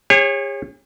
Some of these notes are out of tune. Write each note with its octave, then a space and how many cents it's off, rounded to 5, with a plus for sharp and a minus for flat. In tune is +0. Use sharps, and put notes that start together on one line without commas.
G#4 -45 C#5 -20